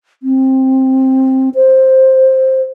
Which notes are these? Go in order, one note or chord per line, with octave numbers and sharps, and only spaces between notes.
C4
C5